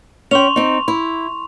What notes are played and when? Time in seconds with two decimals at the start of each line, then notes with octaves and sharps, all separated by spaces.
0.31 C#4 G5 C6 C#6 F7
0.56 C4 D#4
0.88 E4